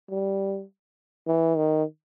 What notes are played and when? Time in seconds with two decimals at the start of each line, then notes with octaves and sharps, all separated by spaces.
0.10 G3
1.27 E3
1.57 D#3